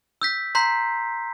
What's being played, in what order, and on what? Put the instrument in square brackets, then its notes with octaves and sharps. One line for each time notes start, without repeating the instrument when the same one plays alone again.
[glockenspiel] E6 G6 B6
A#5 C6 G6 B6 C7